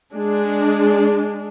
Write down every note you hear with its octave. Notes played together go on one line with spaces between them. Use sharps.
G#3 D4